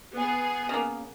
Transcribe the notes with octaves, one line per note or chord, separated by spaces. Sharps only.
B3 G#4
C#3 A#3